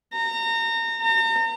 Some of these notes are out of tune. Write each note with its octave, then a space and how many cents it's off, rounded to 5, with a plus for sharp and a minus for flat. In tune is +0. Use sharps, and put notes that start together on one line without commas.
A#5 -30
A#5 -40